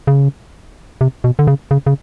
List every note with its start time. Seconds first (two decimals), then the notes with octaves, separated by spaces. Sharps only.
0.07 C#3
1.01 C3
1.24 B2
1.39 D3
1.47 C#3
1.71 C#3
1.87 C#3